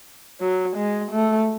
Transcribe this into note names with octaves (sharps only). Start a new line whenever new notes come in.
F#3
G#3
A3